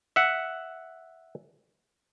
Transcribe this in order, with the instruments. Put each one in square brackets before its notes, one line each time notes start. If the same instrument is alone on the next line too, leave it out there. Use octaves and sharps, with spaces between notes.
[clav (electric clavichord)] E5 F#5